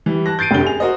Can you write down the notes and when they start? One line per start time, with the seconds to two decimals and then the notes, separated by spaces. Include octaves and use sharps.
0.06 E3 G3
0.26 A5 F#6 A#6
0.39 G6 A6 C7 D7 D#7
0.51 F1 F#2 D3 G4 G7
0.65 G#4 F7
0.80 F#4 A#4 C5 D#5